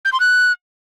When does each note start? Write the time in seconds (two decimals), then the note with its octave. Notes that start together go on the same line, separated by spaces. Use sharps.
0.05 G6
0.13 C6
0.20 F#6